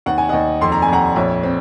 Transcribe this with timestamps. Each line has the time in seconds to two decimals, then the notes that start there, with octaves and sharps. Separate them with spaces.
0.06 D#2 F#5
0.18 G#5
0.29 D#2 D#5 F#5
0.61 F2 C6
0.72 A#5
0.82 G#5
0.88 F2 F#5 A#5
1.16 A#1 C#5
1.43 C4